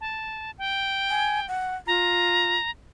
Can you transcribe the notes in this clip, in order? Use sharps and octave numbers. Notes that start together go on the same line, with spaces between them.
A5
G5
G#5
F#5
F4 A#5